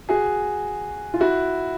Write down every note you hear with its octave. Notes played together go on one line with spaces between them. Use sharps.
F#4 G#4
F4
E4 F#4